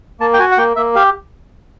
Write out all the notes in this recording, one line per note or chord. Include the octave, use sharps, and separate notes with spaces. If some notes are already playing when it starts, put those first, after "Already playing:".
A#3 A5
G5
F#4 G#5
F#5
A#3 G5
A#3 E5
G4 F5